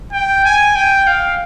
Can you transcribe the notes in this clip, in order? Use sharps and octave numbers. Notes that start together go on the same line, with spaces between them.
G5
G#5
G5
F5